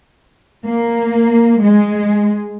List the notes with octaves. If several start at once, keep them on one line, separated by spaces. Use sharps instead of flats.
A#3
G#3